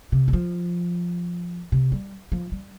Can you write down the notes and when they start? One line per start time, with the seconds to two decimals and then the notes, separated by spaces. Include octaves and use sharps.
0.12 C3
0.28 G3
0.33 F3
1.72 C3
1.92 G3
2.32 F3
2.52 G3